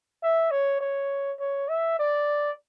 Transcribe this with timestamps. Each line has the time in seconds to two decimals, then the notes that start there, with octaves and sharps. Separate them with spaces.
0.23 E5
0.51 C#5
0.81 C#5
1.39 C#5
1.69 E5
1.99 D5